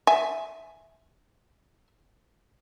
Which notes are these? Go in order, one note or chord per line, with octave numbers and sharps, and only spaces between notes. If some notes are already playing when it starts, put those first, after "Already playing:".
E5 G#5